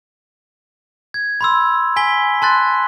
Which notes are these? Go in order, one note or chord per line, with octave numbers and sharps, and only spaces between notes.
G#6
B5 C6 E6
G#5 B6 G7
A5 C6 F#6 A6